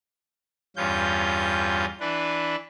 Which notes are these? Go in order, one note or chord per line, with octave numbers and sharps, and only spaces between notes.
E2 G2 C#4 F4 G6
E3 D4 B4